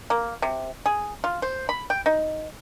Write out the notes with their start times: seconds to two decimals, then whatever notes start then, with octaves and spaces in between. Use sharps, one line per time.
0.10 A#3
0.42 C3
0.86 G#4
1.24 F4
1.42 C5
1.69 B5
1.90 G5
2.06 D#4